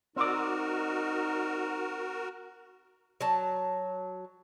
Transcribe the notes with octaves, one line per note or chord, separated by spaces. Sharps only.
C4 D#4 F#4 A#4 D5
F#3 A5